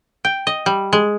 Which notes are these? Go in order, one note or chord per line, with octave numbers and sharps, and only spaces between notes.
G5
D#5
G3
G#3